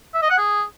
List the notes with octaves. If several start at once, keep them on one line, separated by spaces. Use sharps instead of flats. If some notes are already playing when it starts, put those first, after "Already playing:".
E5
D#5
F#5
G#4